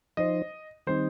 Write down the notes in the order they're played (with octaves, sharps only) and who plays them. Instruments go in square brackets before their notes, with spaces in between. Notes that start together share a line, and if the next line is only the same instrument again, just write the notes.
[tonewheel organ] F3 D#4 C5 [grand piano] D#5
[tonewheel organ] D#3 G3 C4 D#4 [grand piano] C5